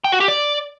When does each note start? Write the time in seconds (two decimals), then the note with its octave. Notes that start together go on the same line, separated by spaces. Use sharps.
0.04 G5
0.12 F#4
0.20 G4
0.28 D5